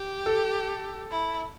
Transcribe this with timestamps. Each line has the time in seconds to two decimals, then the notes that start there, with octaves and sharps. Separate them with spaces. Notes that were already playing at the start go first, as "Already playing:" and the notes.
Already playing: G4
0.26 A4
1.11 E4